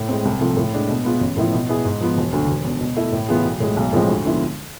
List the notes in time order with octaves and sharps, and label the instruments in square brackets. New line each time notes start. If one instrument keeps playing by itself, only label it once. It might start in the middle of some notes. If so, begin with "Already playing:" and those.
Already playing: [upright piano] A2
G#3 C4
C2
C3 F3 A3
A2
G#3 D4
B2
B3 F4 G#4
A1
A2 F3 B3 E4
B2
B3 E4 G#4
G#2
F3 B3
E1
D2 D3
E1
E2 D3
B2
A3 E4
A2
E3 B3 F4 G#4
B1
A2 G#3
B1
A2 F3 G#3 C4
D2
D3 F3 B3 E4